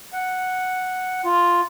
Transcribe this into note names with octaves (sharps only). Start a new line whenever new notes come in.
F#5
F4